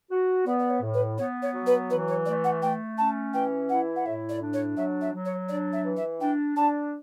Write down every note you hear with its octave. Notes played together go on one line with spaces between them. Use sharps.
F#4
B3 D5
D5
C#5
A2
B4
B3 C#5
C#5
F#3
B4
E3 B4
C#5
A3 D5
F#5
A3 G5
C#4 A5
E3 G5
E4 F#5
F#5
A2 E5
D5
D4
C#5
F#3 E5
E5
F#3
C#5
D4 D5
E5
E3
E5
D4 G5
D4 A5